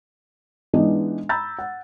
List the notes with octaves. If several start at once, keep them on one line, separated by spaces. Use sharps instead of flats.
E3 G#3 B3 D4 D#4
A#5 B5 E6 G6 A6
F#5